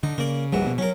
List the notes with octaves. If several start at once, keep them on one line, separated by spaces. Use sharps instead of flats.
D3 D#4
C#3 A#3 D5
D1 A#1 D#2 E3 G3 F#4
B2
F#3 C#4 A#4